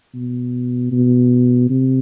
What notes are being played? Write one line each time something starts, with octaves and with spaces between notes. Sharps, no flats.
B2
B2
C3